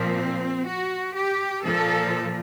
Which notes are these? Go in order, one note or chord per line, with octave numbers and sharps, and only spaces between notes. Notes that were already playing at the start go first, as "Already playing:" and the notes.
Already playing: A#2 F3 C4
F#4
G4
A#2 F3 A4